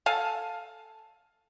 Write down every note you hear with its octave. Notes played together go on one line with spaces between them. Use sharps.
A4 F5 G#5 A5